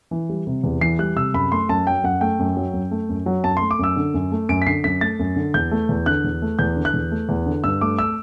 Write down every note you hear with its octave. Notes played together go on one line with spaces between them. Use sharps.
E3
G3
C3
E2
E3 C7
G3 F#6
C3 E6
F#2 B5
A3 C6
F#2 A5
F#3 G5
F#2 F#5
A3 G5
F#2
F#3
F#2
A3
F#2
F#3
F#2 A5
A3 C6
D6
F#2 E6
D3
F#2
A3
F#2 D7
B6
D3 C7
F#2 B6
A3 A6
F#2
D3
E2 G6
A3
E2
D3 F#6
E2
A3
E2 G6
D3
F#6
E2
A3
E2
D3
G2 E6
A3 D6
E6